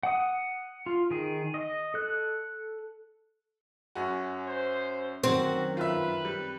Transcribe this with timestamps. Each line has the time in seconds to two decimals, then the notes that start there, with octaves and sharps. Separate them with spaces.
0.03 F#5 D#6
0.86 F4
1.11 D#3 G#4
1.54 D#5
1.94 A4 F#6
3.95 F#2 C#4 F#4
4.47 C5
5.24 F#2 D#3 C4 F#4
5.77 F4 B4 E5
6.25 G3